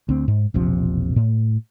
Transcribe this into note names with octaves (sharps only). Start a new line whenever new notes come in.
D2 C4
G#2
E1 A#1 C3 F3
A2